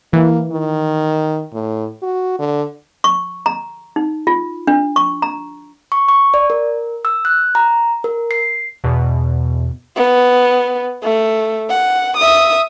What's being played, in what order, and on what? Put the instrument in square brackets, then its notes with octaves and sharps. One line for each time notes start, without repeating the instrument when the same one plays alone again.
[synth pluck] E3 [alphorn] A#3
[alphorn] D#3
A2
F#4
D3
[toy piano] C#6
A#5
D#4
F4
D4
C#6
A#5
[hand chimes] C#6
C#6
D5
A#4
E6
F#6
A#5
A#4
C7
[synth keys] E2 B2
[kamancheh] B3
A3
F#5
E5 D#6